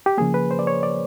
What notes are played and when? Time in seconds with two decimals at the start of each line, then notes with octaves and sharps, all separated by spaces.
0.06 G4
0.18 C#3 F3 A#3 G#4
0.34 B4
0.51 C5
0.59 D5
0.67 C#5
0.83 D5